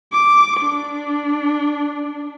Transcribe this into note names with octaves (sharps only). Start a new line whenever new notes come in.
D6
D4